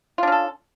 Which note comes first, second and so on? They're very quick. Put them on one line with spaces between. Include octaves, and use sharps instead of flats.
F4 D4 C#4 A4